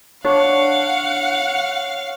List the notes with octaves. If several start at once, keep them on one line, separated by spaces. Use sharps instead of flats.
D4 C#5 F5 F#5